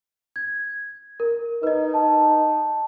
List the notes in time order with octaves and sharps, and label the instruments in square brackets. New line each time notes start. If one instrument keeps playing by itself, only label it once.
[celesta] G#6
A#4
[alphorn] D#4 [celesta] B4 D#5
[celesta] A5